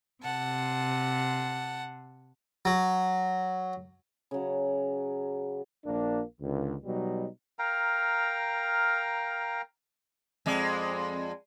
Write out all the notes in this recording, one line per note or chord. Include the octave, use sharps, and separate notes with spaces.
C3 F#5 A5
F#3
C#3 F#3
A#1 A#3 D4
C#2 D3
B2 F#3 G3 D#4
A#4 F5 G5 A#5
F2 G#3 D5